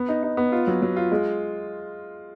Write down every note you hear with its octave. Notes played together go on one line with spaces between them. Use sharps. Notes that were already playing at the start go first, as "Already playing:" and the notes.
Already playing: B3
D#4
D#4
B3
F4
F#3
F#3
F4
G#3